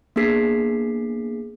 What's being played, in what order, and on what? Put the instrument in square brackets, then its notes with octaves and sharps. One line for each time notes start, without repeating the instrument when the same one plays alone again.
[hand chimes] A#3 B3 D4 G#4 B6 C7